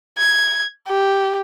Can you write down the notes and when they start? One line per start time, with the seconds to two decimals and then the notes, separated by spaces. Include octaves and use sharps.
0.18 G#6
0.88 G4